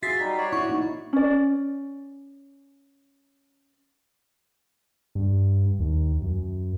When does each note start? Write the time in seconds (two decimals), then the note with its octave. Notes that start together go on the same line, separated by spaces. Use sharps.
0.03 F4 F#4 G#4 E5 A6 B6 C7
0.20 G3 D#4
0.38 F#4 C#5 D5
0.52 E4 C#6
0.68 A#3 D#4 E4
1.13 C#4 D5
5.15 G2
5.79 D#2
6.22 F#2